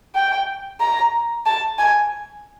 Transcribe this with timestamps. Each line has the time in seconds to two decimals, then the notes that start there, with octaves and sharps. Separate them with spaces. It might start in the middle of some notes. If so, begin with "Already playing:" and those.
0.15 G5
0.81 A#5
1.46 A5
1.79 G#5